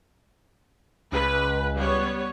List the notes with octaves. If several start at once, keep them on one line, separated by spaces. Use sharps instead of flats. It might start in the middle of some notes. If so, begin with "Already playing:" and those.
C#2 B4
G3 B3 C#5